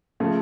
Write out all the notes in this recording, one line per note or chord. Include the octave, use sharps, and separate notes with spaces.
C#3 F3 A3